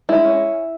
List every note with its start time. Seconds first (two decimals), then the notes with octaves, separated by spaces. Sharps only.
0.09 G#3 E4
0.24 C#4